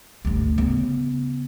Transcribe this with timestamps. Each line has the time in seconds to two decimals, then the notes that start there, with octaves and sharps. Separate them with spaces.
0.25 D2 G2
0.58 C#3 B3